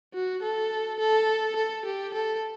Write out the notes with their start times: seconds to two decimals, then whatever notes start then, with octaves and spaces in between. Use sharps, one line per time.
0.14 F#4
0.43 A4
1.00 A4
1.56 A4
1.85 G4
2.14 A4